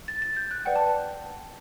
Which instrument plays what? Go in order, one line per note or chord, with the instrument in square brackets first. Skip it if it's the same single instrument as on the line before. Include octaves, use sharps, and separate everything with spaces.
[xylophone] A6
A6
G6
F#6
B4 D5 F#5 G5
A5